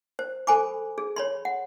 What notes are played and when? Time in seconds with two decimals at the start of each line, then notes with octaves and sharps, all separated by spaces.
0.19 C5
0.47 A4 C5 G#5 B5 D6
0.98 G#4
1.16 C#5 B5 C6
1.45 F#5